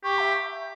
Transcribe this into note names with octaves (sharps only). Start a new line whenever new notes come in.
G4 C#6
E5